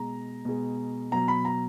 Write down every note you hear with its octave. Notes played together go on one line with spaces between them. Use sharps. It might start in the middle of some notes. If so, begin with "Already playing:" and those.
Already playing: B2 G#3 A#5
B2 G#3
B2 F#3 A#5
B5
A#5